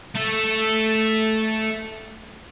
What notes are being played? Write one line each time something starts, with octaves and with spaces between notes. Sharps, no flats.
A3 A4